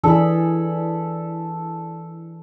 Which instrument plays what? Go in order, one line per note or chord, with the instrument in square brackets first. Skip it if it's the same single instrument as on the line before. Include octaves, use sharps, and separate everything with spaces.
[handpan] E3 D4 G#4 [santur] A4 B5